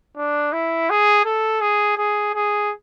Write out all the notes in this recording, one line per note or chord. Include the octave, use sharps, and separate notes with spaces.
D4
E4
G#4
A4
G#4
G#4
G#4